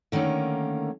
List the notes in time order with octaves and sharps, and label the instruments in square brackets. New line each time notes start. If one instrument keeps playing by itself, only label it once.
[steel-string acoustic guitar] D3 D#3 A3 A#3 C#4